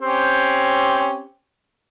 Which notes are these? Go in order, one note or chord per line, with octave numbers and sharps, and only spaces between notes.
C4 C#4 G4